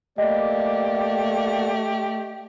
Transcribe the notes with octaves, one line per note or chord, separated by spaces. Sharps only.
A3 A#3 G4 D5 D#5